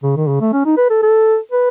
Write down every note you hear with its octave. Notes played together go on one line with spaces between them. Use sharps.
C#3
D#3
C#3
A3
C#4
D#4
B4
A4
A4
B4